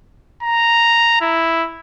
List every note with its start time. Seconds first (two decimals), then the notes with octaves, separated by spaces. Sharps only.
0.43 A#5
1.21 E4